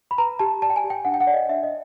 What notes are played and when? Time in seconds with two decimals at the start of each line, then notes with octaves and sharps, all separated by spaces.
0.11 B5
0.18 B4 A#5
0.39 G4 A5
0.62 D5 A5
0.70 G5
0.76 G#5
0.84 G4
0.90 G5
1.05 D4 F#5
1.14 G5
1.20 F#5
1.27 C#5 D5
1.34 D#5
1.49 D4 E5
1.63 D#5